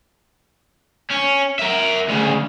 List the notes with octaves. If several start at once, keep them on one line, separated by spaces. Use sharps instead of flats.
C#4
A#4 E5
D2 C#3